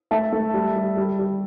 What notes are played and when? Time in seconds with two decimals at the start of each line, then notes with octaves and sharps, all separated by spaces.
0.11 A3 E5 A5
0.33 A3
0.54 G3
0.76 G3
0.97 G3
1.19 G3